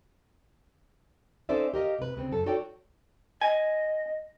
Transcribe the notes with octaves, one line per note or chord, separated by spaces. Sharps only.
C#4 D#4 A4 C5 D5 E5
G4 A#4 D#5 F5
C3 B4
D2 C#3 C4
F#2 A4
D#4 F#4 A4 C#5 D5 G5
D#5 G#5